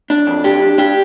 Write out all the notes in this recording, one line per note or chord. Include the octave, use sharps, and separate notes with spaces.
D4
F2
D4 G4
D4
D4 G4